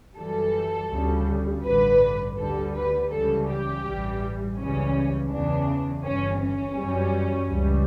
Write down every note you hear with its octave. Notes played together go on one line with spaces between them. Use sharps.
F#2 E3 G3 A4
D2 C#3 G3
A1 G2 D3 B4
D2 D3 G3 A4
B4
C#2 C#3 E3 G3 A4
G4
A1 G2 E3 G3
C#2 C#3 E3 G3 C#4
E2 C#3 E3 D4
G1 G2 E3 C#4
C#4
F#2 E3 G3
C#2 C#3 E3 G3